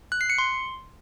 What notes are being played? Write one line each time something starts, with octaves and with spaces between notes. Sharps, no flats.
F#6
C7
C#7
C6